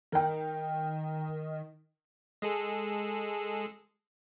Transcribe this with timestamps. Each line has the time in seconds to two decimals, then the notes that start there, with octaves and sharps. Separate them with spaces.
0.12 D#3 A#4 G5
2.42 G#3 G#4 A4